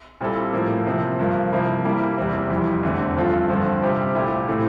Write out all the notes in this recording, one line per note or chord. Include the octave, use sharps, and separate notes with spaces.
A#2 G3 C4 E4 A4
A2 F3 A#3
C3 F3 C4
G2 F3 A#3
C3 F3 A#3 E4
E3 G3 A#3 E4
E2 C3 E3 G3 C4
F2 E3 G3
E2 D3 A3 C4
G2 F3 C4 F4 A4
G2 D3 F3 C4
C3 G3 C4 G4
A#2 A3 E4 G4
A2 E3 A3 C4